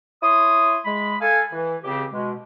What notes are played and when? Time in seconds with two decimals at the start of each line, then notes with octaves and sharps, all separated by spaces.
0.23 E4 C#5 C6 D#6
0.85 G#3 B5
1.21 A4 F5 G#5
1.52 E3
1.84 C#2 C#3 C4 G4
2.12 B2 G#3